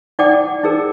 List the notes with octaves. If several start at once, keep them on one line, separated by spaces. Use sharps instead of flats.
D#4 D5 F#5 G5 A5 D6
D#4 G#4 A#4